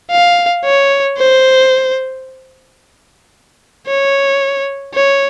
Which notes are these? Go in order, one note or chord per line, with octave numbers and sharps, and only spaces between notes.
F5
C#5
C5
C#5
C#5